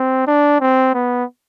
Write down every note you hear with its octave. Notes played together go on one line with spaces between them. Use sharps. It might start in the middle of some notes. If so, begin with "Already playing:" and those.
Already playing: C4
D4
C4
B3